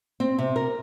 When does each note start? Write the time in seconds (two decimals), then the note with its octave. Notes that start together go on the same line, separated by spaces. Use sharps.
0.20 C4
0.38 C3
0.56 A#4